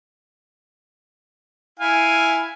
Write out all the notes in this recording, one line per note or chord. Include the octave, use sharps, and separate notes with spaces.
E4 F5 G#5